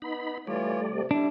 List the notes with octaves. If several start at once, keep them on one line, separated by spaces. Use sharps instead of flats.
B3 D#4 B5
E3 G3 A3 F4 C#5 D5
C3
G3 D4 E4